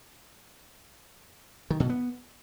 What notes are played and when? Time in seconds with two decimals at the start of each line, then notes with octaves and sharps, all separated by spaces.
1.70 D#3
1.80 B2
1.89 B3